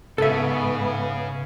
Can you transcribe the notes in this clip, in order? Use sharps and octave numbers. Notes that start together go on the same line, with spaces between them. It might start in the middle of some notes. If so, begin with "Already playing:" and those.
G#2 C#3 B3 A4 E5